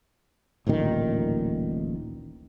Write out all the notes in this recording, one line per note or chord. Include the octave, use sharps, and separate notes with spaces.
D1 A1 A#2 D#3